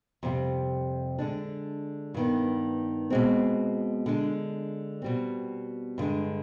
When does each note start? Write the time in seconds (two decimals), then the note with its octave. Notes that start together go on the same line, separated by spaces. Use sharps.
0.23 F2 C3 G3
1.19 D3 G#3 D4
2.14 G2 D#3 B3
3.10 B2 G#3 C4
4.06 D3 G#3 D4
5.02 B2 G3 C4
5.98 G2 D3 G#3